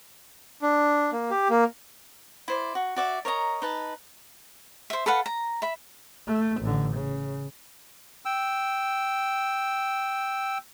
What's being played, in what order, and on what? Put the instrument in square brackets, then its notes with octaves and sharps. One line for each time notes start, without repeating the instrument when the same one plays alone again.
[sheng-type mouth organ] D4
A#3
G4
A#3
[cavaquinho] E4 C5 D5
F#4
F#4 D5 E5
A#4 C#5 D#5 A#5
D#4 B4 A5
C5 E5
A4 B4 F5 F#5
A#5
E5 B5
[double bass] A3
A1 D3
C#3
[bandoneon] G5 E6